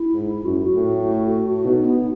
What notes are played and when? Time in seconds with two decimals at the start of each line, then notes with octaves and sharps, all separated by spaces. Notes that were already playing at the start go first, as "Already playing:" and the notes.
Already playing: E4
0.14 G#2
0.44 F#2 F#4
0.61 F#4
0.75 A2
1.64 B2 D#4
1.85 B3